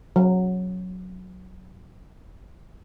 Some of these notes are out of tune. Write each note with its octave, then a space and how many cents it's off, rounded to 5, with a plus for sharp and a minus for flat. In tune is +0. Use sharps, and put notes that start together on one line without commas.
F#3 -10